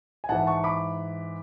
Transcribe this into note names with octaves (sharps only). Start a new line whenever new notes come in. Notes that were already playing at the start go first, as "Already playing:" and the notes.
G#5
G#2 E3 F#5 A5
A5 C#6
B5 D6